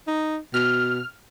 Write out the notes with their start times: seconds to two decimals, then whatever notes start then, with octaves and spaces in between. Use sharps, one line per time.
0.07 D#4
0.54 B2 F6